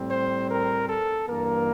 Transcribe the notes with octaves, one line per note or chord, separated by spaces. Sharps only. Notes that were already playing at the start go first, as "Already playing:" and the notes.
Already playing: A2 G3 C4
C5
A#4
A4
G2 E3 A#3 A#4